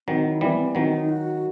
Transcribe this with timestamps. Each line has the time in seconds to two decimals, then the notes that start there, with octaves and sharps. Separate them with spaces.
0.08 D#3 F#3 C4
0.25 E4
0.41 E3 G3 C4
0.50 B3
0.58 C4
0.67 B3
0.75 D#3 F#3 C4
0.92 D#4
1.09 F#4